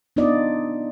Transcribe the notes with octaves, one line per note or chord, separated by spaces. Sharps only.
B3 D4 D#4 F4 D5 D#5